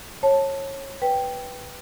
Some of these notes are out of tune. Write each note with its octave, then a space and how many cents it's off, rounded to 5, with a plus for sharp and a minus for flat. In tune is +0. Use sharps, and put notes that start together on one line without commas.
C#5 -25 A5 +0
B4 +0 G5 +0